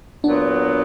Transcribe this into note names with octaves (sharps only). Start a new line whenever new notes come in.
A#2 F#3 B3 D4